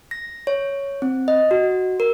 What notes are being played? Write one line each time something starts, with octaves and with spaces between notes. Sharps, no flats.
A#6
C#5
C4
D#5
F#4
A#4